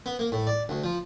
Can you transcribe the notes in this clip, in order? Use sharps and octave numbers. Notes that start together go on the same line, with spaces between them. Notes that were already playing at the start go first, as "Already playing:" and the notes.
B3
A#3
A2
D5
D2
F3